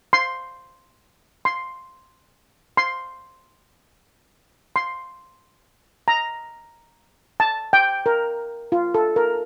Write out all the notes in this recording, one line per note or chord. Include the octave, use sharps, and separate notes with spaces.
C6
C6
C6
C6
A#5
A5
G5
A#4
F4
A4
A#4